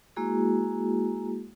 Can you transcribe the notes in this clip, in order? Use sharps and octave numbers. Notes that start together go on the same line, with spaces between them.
G#3 A#3 E4 F#4 G#4